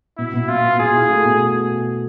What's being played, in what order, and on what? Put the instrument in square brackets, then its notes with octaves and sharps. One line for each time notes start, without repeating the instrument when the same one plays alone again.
[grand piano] B2 [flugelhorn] E4
[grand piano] B2
[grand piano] B2 [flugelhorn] F4
[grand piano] B2
[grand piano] B2 [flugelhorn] G#4
[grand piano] E4
A3
B2